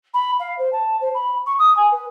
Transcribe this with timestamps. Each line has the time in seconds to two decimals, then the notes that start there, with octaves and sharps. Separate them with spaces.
0.14 B5
0.39 F5
0.58 C5
0.72 A5
1.00 C5
1.14 B5
1.46 C#6
1.58 D#6
1.76 G#5
1.92 B4